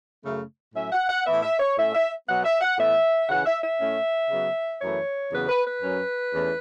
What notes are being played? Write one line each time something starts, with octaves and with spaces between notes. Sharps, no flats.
F#2 C#3 A3
A2 F#3 C#4 E5
F#5
F#5
A2 E3 B3 E5
E5
C#5
A2 A3 C#4 E5
E5
B2 F#3 B3 F#5
E5
F#5
A2 E3 B3 E5
C#3 E3 C#4 F#5
E5
E5
A2 A3 C#4
C#3 F#3 B3
F#2 E3 A3 C#5
E2 C#3 F#3 B3 B4
B4
B4
F#2 F#3 C#4
E2 E3 A3 C#4